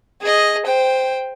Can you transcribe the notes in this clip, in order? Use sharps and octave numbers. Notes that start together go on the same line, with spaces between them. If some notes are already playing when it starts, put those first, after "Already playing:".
G#4 D#5
C5 G5